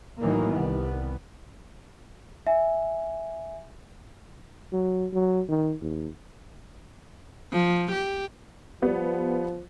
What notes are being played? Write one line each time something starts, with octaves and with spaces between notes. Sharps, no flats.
A2 D#3 E3 F#3 A#3
C2 G3 B3
E5 G#5
F#3
F#3
D#3
D#2
F3
G4
F3 G3 B3